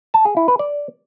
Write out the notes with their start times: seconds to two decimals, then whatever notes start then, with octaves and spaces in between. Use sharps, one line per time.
0.14 A5
0.25 G#4
0.37 E4
0.48 B4
0.59 D5